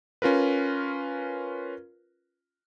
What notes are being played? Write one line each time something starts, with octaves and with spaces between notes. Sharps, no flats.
C#4 F4 A#4 B4